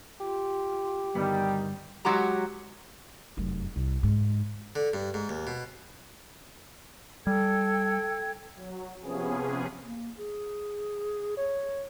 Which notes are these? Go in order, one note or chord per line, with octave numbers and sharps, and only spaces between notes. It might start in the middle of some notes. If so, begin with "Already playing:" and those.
F4 G4
D2 G2 D#3 G3 B3
F#3 G#3 F#4 G4 A#5
F1 F#2
C2
G#2
D3
G2
G#2
D#2
B2
G3 A4 G5 G#6
F#3
C3 F3 B3 C#4 G#4
A#3
G#4
C#5